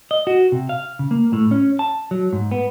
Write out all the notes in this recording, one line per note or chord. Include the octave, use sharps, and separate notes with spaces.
D#5
F#4
C3
F5
C#3
A#3
A2
C#4
A5
F#3
G#2
B3